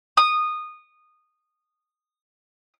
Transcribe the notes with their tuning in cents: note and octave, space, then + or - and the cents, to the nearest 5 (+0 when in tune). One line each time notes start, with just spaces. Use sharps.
D#6 -15